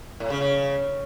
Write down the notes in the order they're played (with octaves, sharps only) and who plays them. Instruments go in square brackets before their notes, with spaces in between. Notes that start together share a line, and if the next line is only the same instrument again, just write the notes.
[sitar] A2
C#3
C#3